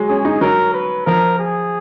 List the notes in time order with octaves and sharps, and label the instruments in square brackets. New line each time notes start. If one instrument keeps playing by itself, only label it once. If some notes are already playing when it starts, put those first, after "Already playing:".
Already playing: [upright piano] F#3 G#3
[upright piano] C#4 [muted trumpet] G#4
[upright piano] D#4
[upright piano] F#3 [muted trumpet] A#4
[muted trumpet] B4
[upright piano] F3 [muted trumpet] A#4
[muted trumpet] G#4